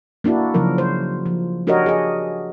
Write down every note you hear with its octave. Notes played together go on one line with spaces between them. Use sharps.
A#3 D4 E4 F#4
C#3 F3 F#3 A#4
C5
F3
D4 F#4 G4 A#4 C#5 D#5
G#4 D#5